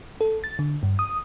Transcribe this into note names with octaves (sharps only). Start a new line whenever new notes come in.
A4
A6
D3
G2
D#6